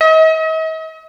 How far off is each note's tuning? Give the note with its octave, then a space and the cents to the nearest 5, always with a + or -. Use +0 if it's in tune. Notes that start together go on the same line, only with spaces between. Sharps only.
D#5 +45